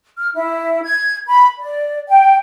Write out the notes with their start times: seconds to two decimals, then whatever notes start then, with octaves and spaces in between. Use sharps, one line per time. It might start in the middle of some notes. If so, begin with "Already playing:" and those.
0.17 F6
0.35 E4
0.84 G#6
1.27 B5
1.59 D5
2.09 G5